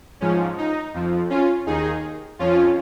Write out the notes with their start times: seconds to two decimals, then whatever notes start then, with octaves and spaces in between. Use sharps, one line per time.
0.21 G#2 F3 C#4
0.58 D#4
0.94 F2 F3
1.30 C#4 F4
1.66 D#2 D#3 D#4 G#4
2.39 F2 F3 C#4 F4